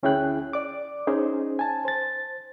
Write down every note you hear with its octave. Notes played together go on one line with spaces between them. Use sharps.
D2 C#4 E4 G#4 G5 F#6
D5 D6
C#4 D#4 G#4 C5
G#5 A5
C5 A6